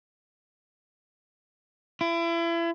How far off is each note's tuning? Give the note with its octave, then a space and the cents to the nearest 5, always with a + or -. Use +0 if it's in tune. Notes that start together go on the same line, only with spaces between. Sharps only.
E4 +35